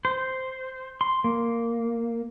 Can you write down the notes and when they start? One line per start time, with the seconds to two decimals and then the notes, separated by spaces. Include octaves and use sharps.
0.05 C5
1.01 C6
1.24 A#3